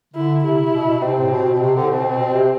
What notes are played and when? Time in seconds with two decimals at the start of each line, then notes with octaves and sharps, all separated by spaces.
0.14 D3 E4
0.43 C3 E4
0.62 C3
0.73 B2
0.87 B2
1.02 C3 C4
1.20 A2
1.31 B2
1.53 B2
1.60 C3 C4
1.75 D3
1.83 A2
1.90 B2
2.18 B2
2.33 C3